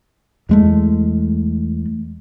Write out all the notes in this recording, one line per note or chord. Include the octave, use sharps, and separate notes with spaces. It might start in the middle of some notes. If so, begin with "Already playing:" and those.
E2 G#3 A3